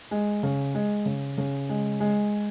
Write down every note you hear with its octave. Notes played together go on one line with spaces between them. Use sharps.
G#3
C#3
G#3
C#3
C#3
G#3
G#3